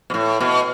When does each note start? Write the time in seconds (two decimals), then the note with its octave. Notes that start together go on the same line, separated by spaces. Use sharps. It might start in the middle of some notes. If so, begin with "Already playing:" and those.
0.10 B2
0.14 A2
0.40 B2